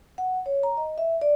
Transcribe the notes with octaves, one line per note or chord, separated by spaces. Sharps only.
F#5
C#5
A#5
D#5
E5
D5